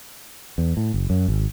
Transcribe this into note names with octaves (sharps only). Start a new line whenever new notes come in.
E2
A2
F#1
F#2
G#1